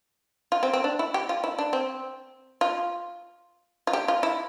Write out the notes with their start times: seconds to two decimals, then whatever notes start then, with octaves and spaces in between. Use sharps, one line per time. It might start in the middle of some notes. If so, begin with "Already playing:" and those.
0.52 F4
0.63 C4
0.73 C4
0.84 D4
0.99 E4
1.14 G4
1.29 F4
1.44 E4
1.59 D4
1.73 C4
2.61 F4
3.87 F4
3.93 G4
4.08 F4
4.23 E4